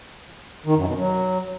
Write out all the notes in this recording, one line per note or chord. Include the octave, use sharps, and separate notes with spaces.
D#3
F#2
B2
F#3